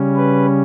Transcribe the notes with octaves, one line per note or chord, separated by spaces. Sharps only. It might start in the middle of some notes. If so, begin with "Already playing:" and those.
Already playing: C#3 G3 C#4
B4